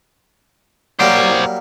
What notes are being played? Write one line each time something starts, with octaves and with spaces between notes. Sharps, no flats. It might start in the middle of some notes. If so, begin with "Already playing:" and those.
F#3 G3 A#3 C5 D5